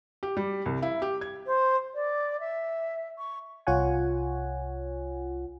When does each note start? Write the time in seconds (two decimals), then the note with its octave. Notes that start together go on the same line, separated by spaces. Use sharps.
0.23 G4
0.37 G3
0.66 C2
0.82 E4
1.02 G4
1.21 G#6
1.46 C5
1.94 D5
2.40 E5
3.18 C#6
3.67 C2 F4 C#5 F#5 G#5